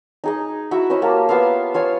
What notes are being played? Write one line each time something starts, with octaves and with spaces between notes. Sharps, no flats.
D#4 G#4 D#5
E4 F#4 E5 F#5
C#4 C5 D#5 B5
A#3 G4 A5
B3 F4 E5 F5
F4 C#5 G#5